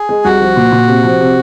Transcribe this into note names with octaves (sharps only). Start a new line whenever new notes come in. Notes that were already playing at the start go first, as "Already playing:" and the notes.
Already playing: G#4
G#3
C2 F#4
F3
A#2
A#2
C3
F3
C3